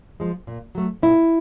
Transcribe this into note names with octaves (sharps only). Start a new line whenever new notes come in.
F3 G#3
A#2
F#3 A3
A#2 E4